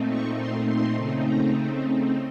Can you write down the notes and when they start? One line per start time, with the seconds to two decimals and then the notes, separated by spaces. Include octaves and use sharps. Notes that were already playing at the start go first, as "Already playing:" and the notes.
Already playing: A#2 A3 C4 D#4
0.09 C#6
0.39 C6
0.67 C6
0.96 C#3 A3 C4 D#4
1.25 A#5